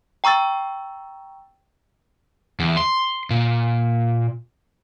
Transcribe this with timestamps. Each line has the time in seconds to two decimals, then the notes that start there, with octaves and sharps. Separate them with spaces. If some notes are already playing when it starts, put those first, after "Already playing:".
0.24 G5 A#5 C#6 E6 A6
2.60 E2
2.77 C6
3.30 A#2